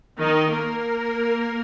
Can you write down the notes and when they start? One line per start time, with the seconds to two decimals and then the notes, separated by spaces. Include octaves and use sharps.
0.19 D#3 D#4
0.51 A#3 A#4